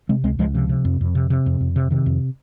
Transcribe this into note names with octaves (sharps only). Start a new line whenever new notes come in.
C3 G#3 C4
C#2 G#3 C4
C#2 F3 G#3
C3 F3
C3
F2
F2
C3
C3
F2
F2
C3
C3 D#3
F2